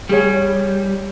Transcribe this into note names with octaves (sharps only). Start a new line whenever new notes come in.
G3 G#4 C#5 G#5